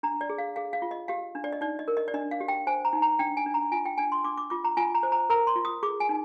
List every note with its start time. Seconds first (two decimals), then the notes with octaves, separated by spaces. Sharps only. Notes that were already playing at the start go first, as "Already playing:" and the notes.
0.03 D4 A#5
0.21 D5
0.29 G#4
0.38 F5
0.56 G#4 F5
0.73 F5
0.82 F4
0.91 D#5
1.08 G4 F5
1.35 D4
1.44 D5
1.53 D#5
1.61 D#4 D5
1.79 D#5
1.88 A#4
1.97 D#5
2.08 D5
2.14 D4 D#5
2.31 F5
2.40 G4
2.48 G5
2.67 C5 G#5
2.85 A#5
2.93 D#4
3.02 A#5
3.19 D4 G5
3.37 G#5
3.46 D4
3.54 A#5
3.72 F4 G#5
3.85 G5
3.97 D4 G#5
4.12 C6
4.24 D4 D6
4.37 D6
4.50 F4 D6
4.64 A#5
4.77 F4 G#5
4.95 A#5
5.03 C5
5.12 A#5
5.30 A#4 A#5
5.47 C6
5.56 F4
5.65 D#6
5.83 G#4 D6
6.00 G#5
6.09 D#4